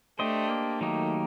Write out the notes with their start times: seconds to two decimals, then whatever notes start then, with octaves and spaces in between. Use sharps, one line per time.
0.19 A3 D4 G4 C5 D#5
0.49 A#3
0.80 D#3 F#3 A3 A#3 D#4 G4